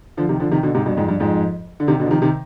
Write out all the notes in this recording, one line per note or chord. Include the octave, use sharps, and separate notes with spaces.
D3 F3
C3 D#3
D3 F3
C3 D#3
B2 D3
G#2 C3
G2 B2
F2 G#2
G2
F2 G#2
D3
C3 D#3
B2 D3
F3
C3 D#3
C3 D#3